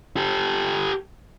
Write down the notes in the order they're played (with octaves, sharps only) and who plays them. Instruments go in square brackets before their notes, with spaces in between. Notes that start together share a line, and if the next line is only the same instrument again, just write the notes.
[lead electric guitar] G4 A4